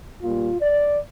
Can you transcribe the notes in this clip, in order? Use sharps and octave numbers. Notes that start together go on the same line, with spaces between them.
A#2 G3 A#3 F4
D5